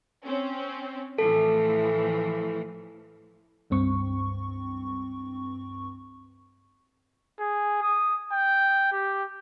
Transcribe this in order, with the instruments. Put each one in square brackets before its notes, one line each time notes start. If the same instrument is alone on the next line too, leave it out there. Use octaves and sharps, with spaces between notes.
[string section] C4 C#4
[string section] A2 E3 F3 [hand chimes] A4
[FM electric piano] C#2 G2 C4 C#6
[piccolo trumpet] G#4
D#6
G5
G4